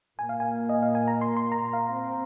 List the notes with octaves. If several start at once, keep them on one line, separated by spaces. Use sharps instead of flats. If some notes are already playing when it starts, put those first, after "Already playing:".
A#2 A#3 G#5
F5
G#5
D#5
F5
G#5
A#5
C6
C6
A#5
F5
C4